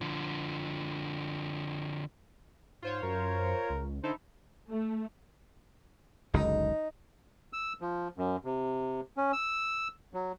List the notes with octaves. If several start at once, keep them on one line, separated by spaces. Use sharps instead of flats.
D3 F3
G#2 F4 C5 C#5
F#2 A#4
C#2
D3 D#4 E4 A4 C5
A3
F#1 C#2 D3 D#4
E6
F3
F#2
C3
C#4
E6
F#3